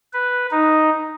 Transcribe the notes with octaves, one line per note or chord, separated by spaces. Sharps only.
B4
D#4